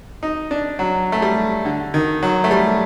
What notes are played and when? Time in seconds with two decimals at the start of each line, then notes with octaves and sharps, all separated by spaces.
0.23 D#4
0.51 D4
0.79 F#3
1.12 A3
1.22 G3
1.65 D3
1.94 D#3
2.23 F#3
2.44 A3
2.51 G3